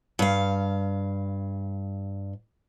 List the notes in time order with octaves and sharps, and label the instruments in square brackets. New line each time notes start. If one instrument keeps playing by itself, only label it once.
[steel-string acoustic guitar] G2 F5